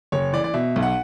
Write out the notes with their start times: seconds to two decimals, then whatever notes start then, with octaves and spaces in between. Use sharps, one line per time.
0.12 F#1 C#5
0.33 E3 D5
0.44 D5
0.54 B2 E5
0.76 B1
0.83 F#5